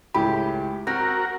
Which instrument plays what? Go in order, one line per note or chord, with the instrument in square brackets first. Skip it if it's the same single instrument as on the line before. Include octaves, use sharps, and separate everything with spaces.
[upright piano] C#2 A2 E4 [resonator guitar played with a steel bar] G4 [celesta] B5
[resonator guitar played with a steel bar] C4 [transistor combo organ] F#4 A#4 [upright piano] A#6